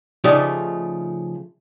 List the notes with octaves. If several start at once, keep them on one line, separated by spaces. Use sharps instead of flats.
C#3 F3 A3 D#4 G4 D5